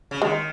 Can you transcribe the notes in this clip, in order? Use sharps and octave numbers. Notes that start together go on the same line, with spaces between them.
C#3
D#3 G#3